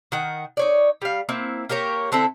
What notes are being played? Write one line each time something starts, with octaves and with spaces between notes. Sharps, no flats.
D#3 A#4 F#5
D#4 C#5 D5
G3 F5
A#3 C4 E4
A#3 G4 A#4 C#5
D3 C4 E4 A4